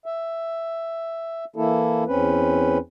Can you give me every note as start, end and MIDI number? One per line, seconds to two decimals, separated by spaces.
0.06 1.45 76
1.56 2.04 52
1.56 2.04 58
1.56 2.04 64
1.56 2.04 69
2.07 2.78 40
2.07 2.78 60
2.07 2.78 61
2.07 2.78 71